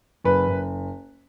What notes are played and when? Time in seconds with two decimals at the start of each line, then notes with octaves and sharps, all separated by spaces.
0.24 F#1 B4
0.48 F#1